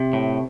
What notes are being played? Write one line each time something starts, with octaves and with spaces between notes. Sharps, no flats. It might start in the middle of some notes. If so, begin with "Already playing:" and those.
Already playing: C3
A2